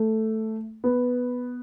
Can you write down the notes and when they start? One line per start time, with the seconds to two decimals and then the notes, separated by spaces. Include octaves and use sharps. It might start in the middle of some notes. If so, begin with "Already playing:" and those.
Already playing: A3
0.84 B3